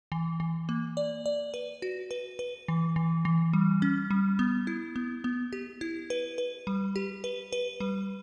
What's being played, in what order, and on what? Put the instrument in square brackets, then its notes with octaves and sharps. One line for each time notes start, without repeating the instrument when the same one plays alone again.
[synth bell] E3
E3
A#3
D5
D5
B4
F#4
B4
B4
E3
E3
E3
G3
C#4
G3
B3
E4
B3
B3
G4
E4
B4
B4
G3
G4
B4
B4
G3